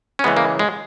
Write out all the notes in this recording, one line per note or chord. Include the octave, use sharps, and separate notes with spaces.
C#4
C#3 E3 G#3 B3
A#3
G#3